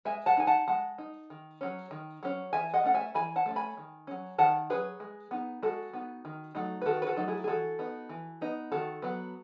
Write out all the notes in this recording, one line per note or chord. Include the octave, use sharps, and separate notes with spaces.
G#3 E5 G#5
F#5 A5
D#4 G#5
F#5 A5
G#3 F#5 A5
D#4
D#3
F#3 C#4
D#3
F#3 C#4
E3 E5 G#5
D#5 F#5
A3 C#4 F#5
E5 G#5
E3 G#5 B5
F#5 A5
A3 C#4
G#5 B5
D#3
F#3 C#4
D#3 F#5 A5
F#3 C#4 G#4 B4
G#3
B3 D#4
G#3 F#4 A4
B3 D#4
D#3
F#3 A3 D#4
B4
D#3 F#4 A4
B4
F#4 A4
F#3 A3 D#4
E4 G#4
G#4
E3 F#4 A4
B3 D#4
E3
B3 D#4
D#3 F#4 A4
F#3 B3